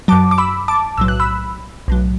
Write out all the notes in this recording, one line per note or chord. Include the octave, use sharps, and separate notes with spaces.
F#2 F#3 A5 D6
D6
B5 E6
A5 D6
B1 A2 F#3 E6
F#6
B5 E6
B1 A2 F#3